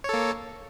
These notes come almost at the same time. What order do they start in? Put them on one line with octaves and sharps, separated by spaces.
C#5 A4 A#3